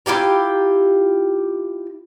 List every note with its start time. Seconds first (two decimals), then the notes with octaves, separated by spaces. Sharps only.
0.06 E4 F4 G4 A#5